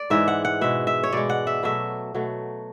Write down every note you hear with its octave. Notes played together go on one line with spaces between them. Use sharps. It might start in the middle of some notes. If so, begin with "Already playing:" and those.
Already playing: D5
G#2 E3 G#3 E5
F#5
F#5
B2 G#3 E5
E5
C#5
B2 G#3 D5
F#5
E5
B2 F#3 A3 E5
B2 F#3 A3